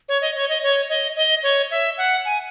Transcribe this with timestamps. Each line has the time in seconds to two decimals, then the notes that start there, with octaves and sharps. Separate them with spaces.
0.09 C#5
0.22 D#5
0.36 C#5
0.49 D#5
0.63 C#5
0.89 D#5
1.16 D#5
1.43 C#5
1.71 E5
1.98 F#5
2.25 G#5